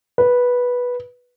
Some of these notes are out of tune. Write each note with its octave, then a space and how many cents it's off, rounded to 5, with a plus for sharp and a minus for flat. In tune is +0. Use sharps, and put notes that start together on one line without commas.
B4 -10